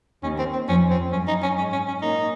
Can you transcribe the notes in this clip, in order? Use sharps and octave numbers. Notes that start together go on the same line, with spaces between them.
D#2 D#3 C#4
C4
C4
F2 F3 C#4
C4
F#2 F#3 C#4
D#4
C#4
G#2 G#3 C#4
C#4
C#4
A#2 A#3 D#4